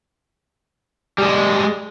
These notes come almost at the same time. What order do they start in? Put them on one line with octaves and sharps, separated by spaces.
G3 G#4 G#3